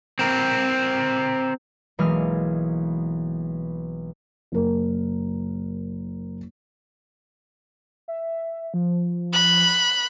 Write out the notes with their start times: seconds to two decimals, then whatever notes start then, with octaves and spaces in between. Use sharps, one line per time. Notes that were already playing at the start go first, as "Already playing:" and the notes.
0.19 C4 A#4
1.99 B1 E3 G#3 A#3 G#4 F6
4.52 F#1 A#4
8.08 E5
8.74 F3
9.33 B5 F#6